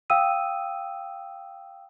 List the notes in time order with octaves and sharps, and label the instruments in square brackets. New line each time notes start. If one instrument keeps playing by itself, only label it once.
[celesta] F5 G5 D#6 E6 D#7